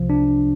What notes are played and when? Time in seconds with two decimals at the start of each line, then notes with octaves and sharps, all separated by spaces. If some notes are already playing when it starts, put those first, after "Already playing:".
Already playing: C2 C3 F3
0.10 D4